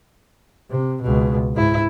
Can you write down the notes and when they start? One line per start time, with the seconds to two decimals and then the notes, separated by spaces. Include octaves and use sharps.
0.70 C3
1.02 C#2 B2
1.55 G#2 E4